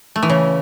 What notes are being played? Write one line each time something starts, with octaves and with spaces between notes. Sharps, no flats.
A3
E3
C#3